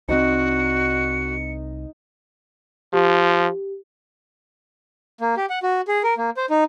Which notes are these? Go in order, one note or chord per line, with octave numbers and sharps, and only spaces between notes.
C2 E3 C4 D#4 F#4 C#7
F3 G4
A#3
G4
F#5
F#4
G#4
A#4
A#3
C5
D#4